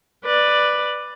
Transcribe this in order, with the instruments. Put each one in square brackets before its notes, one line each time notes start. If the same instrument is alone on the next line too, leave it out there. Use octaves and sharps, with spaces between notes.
[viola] B4 D5